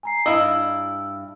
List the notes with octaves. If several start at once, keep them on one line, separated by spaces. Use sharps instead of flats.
G#5 A#5 C7
G2 E4 D#5 E6